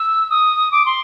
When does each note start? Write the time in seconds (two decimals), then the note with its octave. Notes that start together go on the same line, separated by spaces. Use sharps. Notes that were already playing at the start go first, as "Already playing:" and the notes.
Already playing: E6
0.30 D#6
0.72 D6
0.86 C6